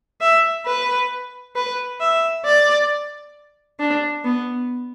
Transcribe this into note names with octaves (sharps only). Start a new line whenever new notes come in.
E5
B4
B4
E5
D5
D4
B3